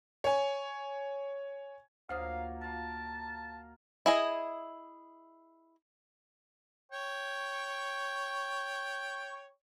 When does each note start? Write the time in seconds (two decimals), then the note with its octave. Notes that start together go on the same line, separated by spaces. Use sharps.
0.24 C#5 G#5
2.09 D2 A#2 F#3 A#3 C5 F5 D#6
2.61 F4 A#4 A5
4.06 E4 G#4 D#5
6.92 C#5 G5 C#6